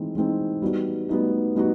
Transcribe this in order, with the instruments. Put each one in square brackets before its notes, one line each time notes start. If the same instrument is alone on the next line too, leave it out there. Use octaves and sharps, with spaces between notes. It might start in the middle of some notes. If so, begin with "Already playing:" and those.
Already playing: [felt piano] E3 G#3 C4 D#4
E3 G#3 C4 D#4
G3 B3 D#4 F#4
G3 B3 D#4 F#4
G3 B3 D#4 F#4